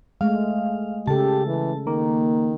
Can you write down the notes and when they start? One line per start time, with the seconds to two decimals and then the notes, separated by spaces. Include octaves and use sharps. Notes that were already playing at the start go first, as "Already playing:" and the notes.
0.21 G#3 A3 F5
1.07 C#3 G4 A4 A5
1.47 E3
1.87 D#3 A#3